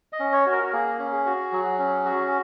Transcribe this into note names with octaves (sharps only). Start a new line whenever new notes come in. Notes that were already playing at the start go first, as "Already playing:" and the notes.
D#5
C#4
C#5
F#4
A#4
F#4
A#3 G#4
C#4
G#4
F#4
F#3
C#4
F#4